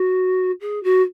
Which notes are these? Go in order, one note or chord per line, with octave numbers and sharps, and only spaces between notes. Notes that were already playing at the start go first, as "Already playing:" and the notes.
Already playing: F#4
G#4
F#4